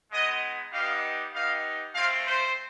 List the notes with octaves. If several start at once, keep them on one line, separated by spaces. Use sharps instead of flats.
G#3 B3 D#4 D#5
G3 B3 D#4 G4 F5
B3 D#4 G4 F5
A3 C4 F4 F5
C5